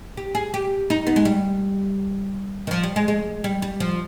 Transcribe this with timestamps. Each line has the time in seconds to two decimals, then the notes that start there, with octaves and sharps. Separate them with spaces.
0.17 G4
0.35 G#4
0.54 G4
0.90 D#4
1.07 B3
1.16 G#3
1.25 G3
2.67 D#3
2.71 F3
2.83 G3
2.96 G#3
3.08 G#3
3.44 G3
3.62 G3
3.80 F3